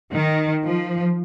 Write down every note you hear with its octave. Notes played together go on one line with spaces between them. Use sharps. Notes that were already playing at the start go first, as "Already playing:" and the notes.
D#3
F3